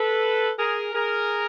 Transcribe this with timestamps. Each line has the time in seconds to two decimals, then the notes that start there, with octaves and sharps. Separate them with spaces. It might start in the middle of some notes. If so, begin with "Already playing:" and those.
Already playing: A4 B4
0.58 G#4 A#4
0.94 G#4 A#4